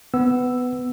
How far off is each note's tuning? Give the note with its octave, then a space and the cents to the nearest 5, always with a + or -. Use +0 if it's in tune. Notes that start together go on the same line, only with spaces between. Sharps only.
B3 +15 E6 +0